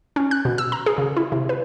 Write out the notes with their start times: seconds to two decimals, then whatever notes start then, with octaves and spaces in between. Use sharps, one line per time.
0.16 C#4
0.31 F#6
0.45 B2
0.58 E6
0.72 A#5
0.86 G#4
0.98 C#3
1.17 E4
1.32 C3
1.49 B4